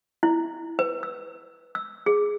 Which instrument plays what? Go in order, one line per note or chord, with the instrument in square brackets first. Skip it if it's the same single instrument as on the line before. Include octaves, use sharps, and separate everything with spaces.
[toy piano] E4
B4
E6
E6
G#4